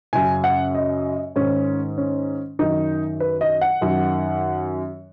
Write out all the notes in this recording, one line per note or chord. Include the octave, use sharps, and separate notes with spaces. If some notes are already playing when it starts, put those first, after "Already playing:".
F#2 C#3 G#5
F#5
D#5
G#2 D#3 C#4
C#4
F#2 D#3 D#4
B4
D#5
F#5
F#2 D#3